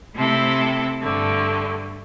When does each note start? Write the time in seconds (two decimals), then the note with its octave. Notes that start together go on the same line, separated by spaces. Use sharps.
0.15 C3 A3 C4 E4 A4
1.00 G2 D3 A3